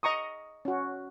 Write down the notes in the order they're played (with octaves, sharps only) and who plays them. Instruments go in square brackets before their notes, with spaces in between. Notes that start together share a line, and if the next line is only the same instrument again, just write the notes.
[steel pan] D#5 A#5 C#6 D#6
C#4 F#4